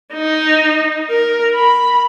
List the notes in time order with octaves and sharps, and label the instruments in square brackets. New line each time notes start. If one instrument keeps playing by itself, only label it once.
[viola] D#4
A#4
B5